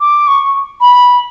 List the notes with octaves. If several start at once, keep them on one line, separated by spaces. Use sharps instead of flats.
D6
C#6
B5